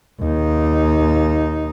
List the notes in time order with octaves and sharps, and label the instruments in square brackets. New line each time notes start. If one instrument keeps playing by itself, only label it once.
[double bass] D#2 D#4